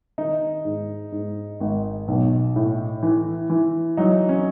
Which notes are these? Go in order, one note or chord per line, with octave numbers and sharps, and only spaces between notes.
D#3 D#4
G#2
G#2
G#1
B1
A2
E3
E3
F#3 D#4
C#4